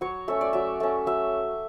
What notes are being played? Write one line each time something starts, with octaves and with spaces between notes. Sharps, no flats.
F#3 C#5
A3 C#4 E5
D5
F#3 E5
A3 C#4
F#3 E5